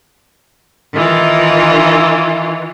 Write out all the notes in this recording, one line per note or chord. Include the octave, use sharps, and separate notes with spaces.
D#3 E3 F4